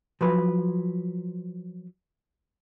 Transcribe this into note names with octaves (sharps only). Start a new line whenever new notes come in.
F3 F#3 B4